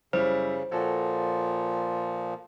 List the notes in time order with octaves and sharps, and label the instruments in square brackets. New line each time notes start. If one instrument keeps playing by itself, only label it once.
[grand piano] F#2 G3 E4 [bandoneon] C#3 [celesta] C5
[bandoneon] A#2 F3 [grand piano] F#4 A4 C#5